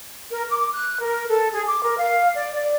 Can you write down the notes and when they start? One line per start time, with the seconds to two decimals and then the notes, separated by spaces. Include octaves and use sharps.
0.31 A#4
0.50 D6
0.73 F#6
1.02 A#4
1.28 A4
1.52 G#4
1.67 D6
1.82 A#4
1.98 F5
2.35 D5
2.53 D5